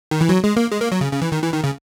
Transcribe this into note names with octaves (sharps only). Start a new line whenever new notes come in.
D#3
E3
F#3
G#3
A#3
G#3
A#3
F#3
C#3
C#3
E3
D#3
E3
D#3
C#3